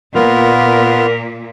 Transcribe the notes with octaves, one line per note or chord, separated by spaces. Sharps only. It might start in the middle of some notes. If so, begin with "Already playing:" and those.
A#2 A#3 B3 F4 A#4